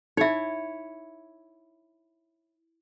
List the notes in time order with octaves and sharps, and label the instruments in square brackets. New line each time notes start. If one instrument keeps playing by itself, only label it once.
[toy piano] D#4 E5 [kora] E4 C#5